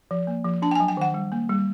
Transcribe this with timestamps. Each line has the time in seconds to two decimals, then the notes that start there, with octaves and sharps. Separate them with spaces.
0.11 F3
0.27 A#3
0.44 F3
0.62 D4 A5
0.71 G5
0.76 G#5
0.80 F#3
0.88 G5
0.97 D#3 F#5
1.14 G3
1.32 A#3
1.49 G3